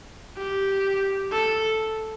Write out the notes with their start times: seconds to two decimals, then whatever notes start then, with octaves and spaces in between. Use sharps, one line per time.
0.37 G4
1.32 A4